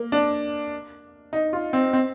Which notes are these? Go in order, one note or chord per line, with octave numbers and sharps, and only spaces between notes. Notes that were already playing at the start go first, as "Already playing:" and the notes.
Already playing: A#3
D4
D#4
F4
C4
C4